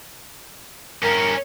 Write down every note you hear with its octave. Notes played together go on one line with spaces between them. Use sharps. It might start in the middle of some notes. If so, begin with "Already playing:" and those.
G2 C#4 A#4